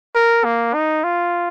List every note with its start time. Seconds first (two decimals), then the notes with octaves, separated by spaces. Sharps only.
0.15 A#4
0.44 A#3
0.74 D#4
1.03 F4